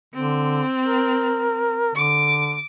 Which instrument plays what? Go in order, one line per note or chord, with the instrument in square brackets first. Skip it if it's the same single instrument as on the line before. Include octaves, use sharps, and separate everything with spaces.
[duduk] D3 [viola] C4
[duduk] A#4
[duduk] D3 [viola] D6